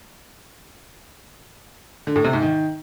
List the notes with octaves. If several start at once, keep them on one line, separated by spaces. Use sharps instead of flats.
D3
A2
C3
G#2
D#3